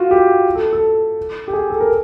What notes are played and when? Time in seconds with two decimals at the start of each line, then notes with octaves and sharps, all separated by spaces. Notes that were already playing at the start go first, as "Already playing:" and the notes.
Already playing: F4 F#4
0.11 G4
0.55 A4
0.73 A4
1.48 G4
1.53 G#4
1.70 A4
1.80 A#4